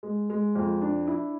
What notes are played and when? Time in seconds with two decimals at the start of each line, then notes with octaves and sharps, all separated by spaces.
0.03 G#3
0.30 G#3
0.55 F2
0.82 D4
1.07 E4